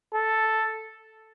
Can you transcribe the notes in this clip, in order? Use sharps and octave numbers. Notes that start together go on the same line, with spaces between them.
A4